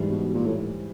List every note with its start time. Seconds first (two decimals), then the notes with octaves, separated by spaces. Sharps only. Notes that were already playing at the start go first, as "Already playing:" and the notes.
Already playing: G#2 E3 G3
0.10 B2
0.34 A#2
0.45 A2